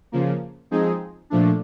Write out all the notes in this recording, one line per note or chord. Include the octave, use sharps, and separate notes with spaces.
C#3 F3 A#3
F3 G#3 C4 D#4 G#4
A#2 F3 A3 D4